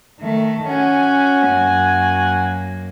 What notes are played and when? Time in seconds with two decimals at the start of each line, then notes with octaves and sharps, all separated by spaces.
0.20 D#3 A3
0.69 C#4 F#4 F#5 G#5
1.48 F#2 A#3